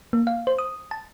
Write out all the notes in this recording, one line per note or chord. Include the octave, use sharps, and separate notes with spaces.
A#3
F5
C5
D#6
A5